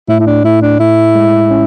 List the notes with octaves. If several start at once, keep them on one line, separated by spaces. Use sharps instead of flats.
A2 E4
E4
D4
A2 E4
D4
A2 E4
G#3
C#4